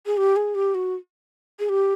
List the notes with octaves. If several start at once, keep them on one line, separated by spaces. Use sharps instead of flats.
G#4
G4
G#4
G4
F#4
G#4
G4